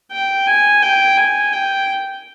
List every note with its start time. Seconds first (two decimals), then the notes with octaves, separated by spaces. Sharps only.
0.12 G5
0.47 G#5
0.82 G5
1.17 G#5
1.53 G5